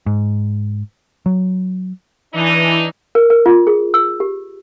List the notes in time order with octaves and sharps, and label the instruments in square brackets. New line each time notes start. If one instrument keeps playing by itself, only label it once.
[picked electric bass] G#2
F#3
[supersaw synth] E3 [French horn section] D4 D#4
[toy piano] A#4
A#4
F4
G#4
E6
G4